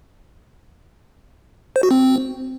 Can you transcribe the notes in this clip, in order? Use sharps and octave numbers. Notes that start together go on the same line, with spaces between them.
C5
F#4
C4